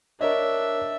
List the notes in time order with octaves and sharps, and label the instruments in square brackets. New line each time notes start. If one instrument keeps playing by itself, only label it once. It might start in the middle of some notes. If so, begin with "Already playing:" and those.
[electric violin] D4 E5 [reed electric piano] A#4 C#5 D#5